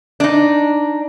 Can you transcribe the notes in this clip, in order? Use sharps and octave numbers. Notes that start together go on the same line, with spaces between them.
D4 D#4